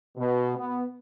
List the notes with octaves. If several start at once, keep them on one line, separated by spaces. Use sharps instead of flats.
B2
B3